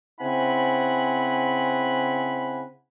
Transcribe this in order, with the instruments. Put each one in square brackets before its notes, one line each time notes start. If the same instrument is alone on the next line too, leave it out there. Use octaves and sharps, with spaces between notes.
[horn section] C#3 C4 E4 F#5 G#5 B5